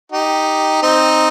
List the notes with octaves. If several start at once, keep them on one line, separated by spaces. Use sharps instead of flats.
D#4 G4
C4 D#4